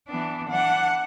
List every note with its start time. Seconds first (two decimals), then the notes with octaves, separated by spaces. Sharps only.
0.09 E3 B3 D4
0.50 E3 D4 F#5